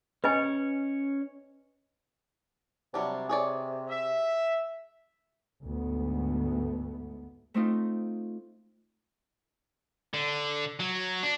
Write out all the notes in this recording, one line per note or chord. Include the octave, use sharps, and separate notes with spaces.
C#4 B4 C#5 D#5 G#5
C3 F#3 G3 D4
G#4 C#5 D5
E5
D2 G#2 A3 B3
A3 C4 D#4 F4
D3
F#3
D4